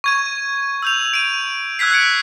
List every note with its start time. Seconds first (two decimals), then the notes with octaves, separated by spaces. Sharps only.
0.04 C#6 G#6 D#7
0.82 E6 G6 F7
1.14 D7 D#7
1.79 E6 F#6 G#6 B6 C7
1.91 F#6 G#6 C#7 D7